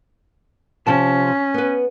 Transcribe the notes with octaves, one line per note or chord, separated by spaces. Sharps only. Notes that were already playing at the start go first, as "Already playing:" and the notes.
C3 F3 C#4 A5
B3 B4